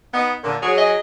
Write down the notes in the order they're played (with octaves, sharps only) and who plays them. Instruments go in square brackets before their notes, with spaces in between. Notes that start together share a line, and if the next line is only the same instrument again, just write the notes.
[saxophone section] B3 D#4
A#2 D3
[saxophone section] F#3 G#4 [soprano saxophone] C#5
[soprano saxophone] D#5